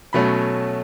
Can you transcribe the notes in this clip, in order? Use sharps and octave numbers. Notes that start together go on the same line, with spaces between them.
B2 F#3 A3 C#4 B5